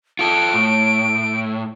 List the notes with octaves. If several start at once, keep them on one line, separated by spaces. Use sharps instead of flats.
F4 A4 D7
A2